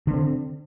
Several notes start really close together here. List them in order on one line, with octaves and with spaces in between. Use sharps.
D3 B3 C4